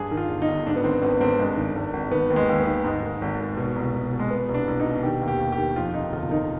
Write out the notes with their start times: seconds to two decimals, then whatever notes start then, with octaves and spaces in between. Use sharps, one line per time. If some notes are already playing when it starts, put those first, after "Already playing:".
Already playing: G2 G#4
0.11 D#3
0.17 F4
0.29 G1
0.42 D#4
0.48 G1
0.67 G#2 D4
0.76 B3
0.84 D#3 C4
1.02 G#1 B3
1.20 G#1 C4
1.39 G2 G#3
1.57 D#3
1.75 G#1
1.93 G#1
2.11 D#3 B3
2.30 D#2
2.36 G#3
2.49 D#2
2.60 B3
2.67 D#3
2.84 G#2 G#3
3.03 D#3
3.22 G#1
3.39 G#1
3.57 B2
3.76 C2
3.94 C2
4.12 B2
4.20 G#3
4.30 B2 B3
4.49 C2
4.54 D4
4.67 C2
4.80 D#4
4.85 B2
5.03 D#3 G4
5.21 D#2
5.28 G4
5.40 D#2
5.52 G4
5.58 D#3
5.76 F2 F4
5.94 C3 D#4
6.13 G1 F4
6.31 D#3 D#4